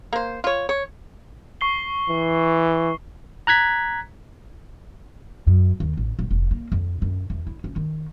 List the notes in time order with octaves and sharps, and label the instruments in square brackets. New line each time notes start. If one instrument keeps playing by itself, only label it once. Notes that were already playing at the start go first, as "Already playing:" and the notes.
[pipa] A#3 C5
F4 C#5
C#5
[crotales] C#6 C7 G7
[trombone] E3
[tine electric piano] A#5 F#6 G#6 B6
[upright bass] F#2
D#2
A1
D#1
F1
A#3
F2
F#2
E2
E4
C#4
D#3